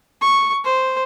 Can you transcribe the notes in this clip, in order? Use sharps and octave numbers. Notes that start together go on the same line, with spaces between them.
C#6
C5